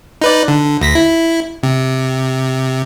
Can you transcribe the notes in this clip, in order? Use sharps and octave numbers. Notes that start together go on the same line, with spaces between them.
D#4 B4 D5
D3
D2 A#6 B6
E4
C3